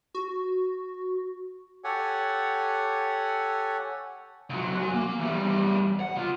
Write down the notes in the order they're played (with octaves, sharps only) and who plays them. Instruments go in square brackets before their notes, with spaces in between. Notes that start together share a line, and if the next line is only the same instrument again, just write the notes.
[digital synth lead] F#4
[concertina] G4 A4 C#5 F#5 G#5
[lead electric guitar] C#2 F#3
F#4 G#5
A#3
E2 G3
F#5
C#3 F4